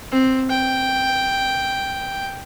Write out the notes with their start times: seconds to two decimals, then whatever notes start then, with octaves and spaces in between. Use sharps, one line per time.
0.12 C4
0.49 G5